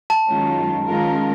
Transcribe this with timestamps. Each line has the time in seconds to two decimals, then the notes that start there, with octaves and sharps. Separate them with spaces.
0.10 A5
0.29 F#2 D#3 G#3 C#4 F4
0.87 D#3 G#3 C#4 F4 A#4